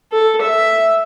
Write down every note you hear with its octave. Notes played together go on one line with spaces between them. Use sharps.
A4
E5